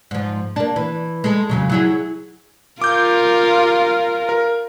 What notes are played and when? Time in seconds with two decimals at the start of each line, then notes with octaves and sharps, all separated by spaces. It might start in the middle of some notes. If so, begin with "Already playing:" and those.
0.11 G#2 F3
0.56 A#3 D4
0.76 E3
1.24 G#3 A4
1.49 F2 C#3 F#3
1.70 F#3 E4 G#4
2.82 F4 A#4 D6 G6
4.29 A#4